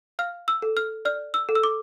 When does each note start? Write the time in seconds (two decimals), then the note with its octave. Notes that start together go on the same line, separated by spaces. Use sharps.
0.19 F5 F6
0.48 E6
0.62 A4
0.77 F6
1.05 D5 F6
1.34 E6
1.49 A4
1.55 E6
1.63 D6